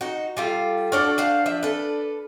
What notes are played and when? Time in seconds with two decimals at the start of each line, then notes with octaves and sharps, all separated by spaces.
0.01 D#4 F#4
0.37 G3 F4 A4
0.92 D4 F#4 A4 D5 F6
1.18 C5 F5 F#5
1.46 F3 E5
1.63 A4 B4